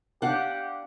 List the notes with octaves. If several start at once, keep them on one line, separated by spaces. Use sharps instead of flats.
D4 G4 F5 F#5